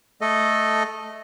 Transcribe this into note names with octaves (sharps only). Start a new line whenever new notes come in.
A3 A4 D#5